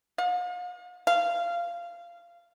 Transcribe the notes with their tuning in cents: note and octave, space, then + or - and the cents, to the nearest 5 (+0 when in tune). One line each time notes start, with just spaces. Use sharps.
F5 +45
F5 -20